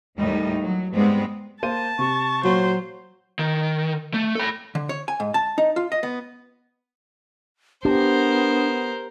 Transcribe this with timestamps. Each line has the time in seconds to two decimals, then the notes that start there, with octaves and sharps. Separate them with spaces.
0.17 D#2 A2 E3 G3 D#4
0.62 F#3
0.93 G#2 G3 G#3 B3 C4
1.63 A#3 C5 A5 D#7
1.99 C3 C#6
2.44 A#2 F#3 C5
3.39 D#3
4.14 A3
4.35 A4 B5
4.75 D3
4.89 C#5
5.08 G#5
5.20 G#2
5.34 A5
5.58 D#4
5.76 F4
5.92 D#5
6.03 B3
7.85 B3 D4 G4 A#4 C5